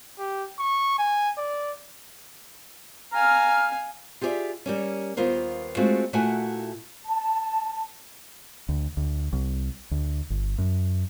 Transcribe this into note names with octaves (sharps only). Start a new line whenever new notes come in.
G4
C#6
G#5
D5
F5 G#5 A#5 F6
F4 G4 G#4 C#5 D5 E5
G3 A#3 C#4
D#2 B3 F4 A#4 C5
G#3 A3 C4 F4 F#4 G#4
A#2 A3 E4 F#4 F#5 G#5
A5
D2
D2
C2
D2
G1
F#2